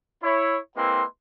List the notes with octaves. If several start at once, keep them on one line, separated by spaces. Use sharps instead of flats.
E4 C#5
G#3 A#3 C4 E4 B4 C6